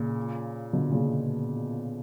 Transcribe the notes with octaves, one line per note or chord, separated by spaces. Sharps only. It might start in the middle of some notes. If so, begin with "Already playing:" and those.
Already playing: A#2 C#3
B2 D3
A#2 C#3